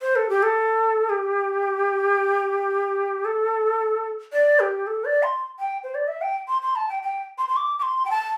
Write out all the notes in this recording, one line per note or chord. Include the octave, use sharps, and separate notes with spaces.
C5
A4
G4
A4
G4
A4
D5
G4
A4
D5
C6
G5
C5
D5
E5
G5
C6
C6
A5
G5
G5
C6
C6
D6
D6
C6
G5
A5